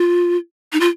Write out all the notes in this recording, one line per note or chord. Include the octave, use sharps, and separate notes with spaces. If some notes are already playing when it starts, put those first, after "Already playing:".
Already playing: F4
D#4
F4